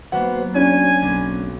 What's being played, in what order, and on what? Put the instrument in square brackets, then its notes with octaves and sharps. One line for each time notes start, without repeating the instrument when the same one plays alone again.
[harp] F#3 A#3 B3 [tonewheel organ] F#4 B4 C5 [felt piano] F#5
[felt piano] C#4 D4 [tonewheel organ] F#4 C#5 [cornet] G#5
[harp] B1 [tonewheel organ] F#3 A#3 C4